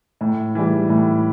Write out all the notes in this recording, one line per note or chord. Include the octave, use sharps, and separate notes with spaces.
A2
E3 G3
A2